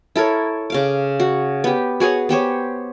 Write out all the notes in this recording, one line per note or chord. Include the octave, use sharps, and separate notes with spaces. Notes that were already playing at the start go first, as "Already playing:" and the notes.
E4 A4 A#4 C#5
C#3 F5 D6
F#4
B3 G4
F#4 G#4 B4 C#5
B3 G4 C5 C#5